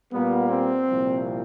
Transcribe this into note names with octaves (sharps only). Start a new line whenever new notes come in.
A#2 G3 A#3 B3
C4
C2 A#2 F3